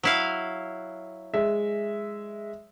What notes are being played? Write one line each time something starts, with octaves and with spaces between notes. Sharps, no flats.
F#3 E4 F5
G#3 E5